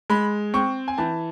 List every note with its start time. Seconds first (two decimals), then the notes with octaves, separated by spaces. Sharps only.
0.10 G#3 B5
0.54 C4 C#6
0.88 G#5
0.98 E3 A5